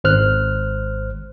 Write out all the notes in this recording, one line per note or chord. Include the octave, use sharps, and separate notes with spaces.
G#1 C5 F6 F#6